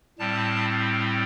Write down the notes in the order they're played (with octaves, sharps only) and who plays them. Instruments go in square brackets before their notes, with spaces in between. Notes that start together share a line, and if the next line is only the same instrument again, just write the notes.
[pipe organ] A2 G3 C4 A5